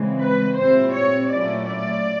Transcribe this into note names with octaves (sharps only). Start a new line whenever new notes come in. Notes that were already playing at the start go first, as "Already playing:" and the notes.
Already playing: C#3 E3 G#3 C4
B4
A#2 G3 C4 E4 C5
C#5
A#2 F#3 A3 C#4 E4 D5
D5